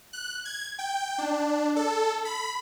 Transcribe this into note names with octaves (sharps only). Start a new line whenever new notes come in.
F#6
G#6
G5
D4
A4
B5